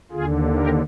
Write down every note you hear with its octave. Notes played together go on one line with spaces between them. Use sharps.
D#2 D3 F4 G#4
G4 A#4